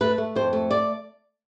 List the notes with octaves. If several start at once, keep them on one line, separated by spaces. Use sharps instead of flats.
A3 B4
A3
F2 C5
A3
D5